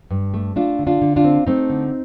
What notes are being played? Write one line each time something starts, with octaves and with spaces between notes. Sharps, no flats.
G2
A3
A3 D4 F4
D3
D4 F4
D3
D4 F4
C4
A3 C4 D#4
D3